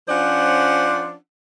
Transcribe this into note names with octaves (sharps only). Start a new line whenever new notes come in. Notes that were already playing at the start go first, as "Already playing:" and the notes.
F3 C#4 D4 F4 C5 F#5